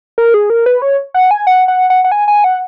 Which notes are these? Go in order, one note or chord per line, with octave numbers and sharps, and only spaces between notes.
A#4
G#4
A#4
B4
C#5
F#5
G#5
F#5
F#5
F#5
F#5
G#5
G#5
F#5